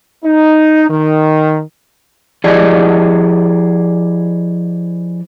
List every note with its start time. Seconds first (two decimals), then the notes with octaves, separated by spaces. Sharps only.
0.25 D#4
0.90 D#3
2.44 F3 E4 G4 G#4 D5 D#5